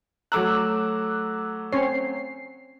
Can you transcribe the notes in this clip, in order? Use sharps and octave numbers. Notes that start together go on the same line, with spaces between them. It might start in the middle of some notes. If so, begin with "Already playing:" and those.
F#3 A3 A#5 D6 E6 F#6
C4 C#4 C#5 C7